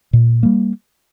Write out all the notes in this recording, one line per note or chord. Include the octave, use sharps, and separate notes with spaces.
A#2
G3 A#3